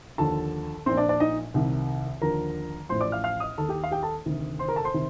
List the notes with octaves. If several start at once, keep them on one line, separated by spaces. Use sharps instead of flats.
D#2 D3 F3 A4 A5
A#1 A#2 F3 C4 C5
D4 D5
D4 D5
D#4 D#5
C2 C3 D#3
D#2 D3 F3 A#4 A#5
A1 A2 F3 C5 C6
D5 D6
F5 F6
F5 F6
D#5 D#6
D#2 D#3 A4 A5
G4 G5
F5
G4 G5
A4 A5
D2 C3 D#3
C5 C6
A#4 A#5
A4 A5
C5 C6
C3 D#3